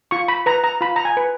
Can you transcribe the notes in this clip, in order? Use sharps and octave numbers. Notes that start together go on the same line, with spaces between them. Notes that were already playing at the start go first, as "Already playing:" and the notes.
F4 C#6
B5
B4 A#5
A#5
F4 B5
A#5
G#5
B4